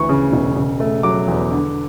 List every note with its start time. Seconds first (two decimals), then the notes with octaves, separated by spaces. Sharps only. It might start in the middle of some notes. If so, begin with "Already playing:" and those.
Already playing: D2 E3 C#6
0.09 C#3
0.33 E1
0.56 C#3
0.80 A3
1.03 F#3 D6
1.28 E2
1.51 D3